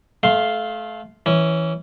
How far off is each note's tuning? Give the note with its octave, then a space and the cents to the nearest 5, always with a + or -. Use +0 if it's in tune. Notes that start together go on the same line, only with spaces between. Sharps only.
A3 -25 F5 +0 C6 +0
E3 -10 C#4 -10